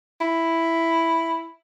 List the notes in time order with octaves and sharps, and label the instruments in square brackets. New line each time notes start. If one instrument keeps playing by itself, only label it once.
[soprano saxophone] E4